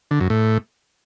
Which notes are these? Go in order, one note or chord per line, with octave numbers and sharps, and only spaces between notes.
D3
F#2
A2